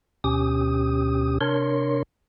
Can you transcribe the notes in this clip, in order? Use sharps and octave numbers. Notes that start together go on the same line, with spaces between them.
D2 B2 C#4 G4 D#6
C3 D4 A#4 C#5 C6